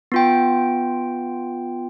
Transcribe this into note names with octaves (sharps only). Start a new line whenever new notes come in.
B3 F4 G5